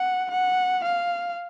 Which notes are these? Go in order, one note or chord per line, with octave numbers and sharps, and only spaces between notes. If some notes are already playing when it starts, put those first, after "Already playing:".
Already playing: F#5
F#5
F5